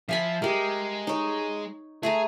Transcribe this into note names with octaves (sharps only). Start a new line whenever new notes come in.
F3 E5 G#5 B5
G#3 G4 A#4
D#4 C#5
A3 G#4 A4 A#5